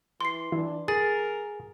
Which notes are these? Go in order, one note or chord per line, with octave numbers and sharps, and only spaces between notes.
E3 C6 C7
E3 D4
G#4 A#4 A6